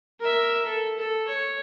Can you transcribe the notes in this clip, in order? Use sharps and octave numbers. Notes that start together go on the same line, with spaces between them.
A#4 E5
A4
A4
C#5